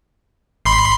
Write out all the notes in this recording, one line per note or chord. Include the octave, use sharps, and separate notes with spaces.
G#1 B5 C6 C7